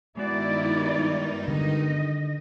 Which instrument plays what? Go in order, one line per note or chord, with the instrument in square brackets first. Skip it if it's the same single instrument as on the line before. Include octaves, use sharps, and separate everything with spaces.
[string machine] G2 D#3 D#4 [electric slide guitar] G#3 B3 F#4 [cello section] E4 D5
[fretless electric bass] D3 [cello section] D#5